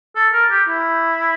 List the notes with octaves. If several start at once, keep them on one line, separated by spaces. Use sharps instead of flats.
A4
A#4
G4
E4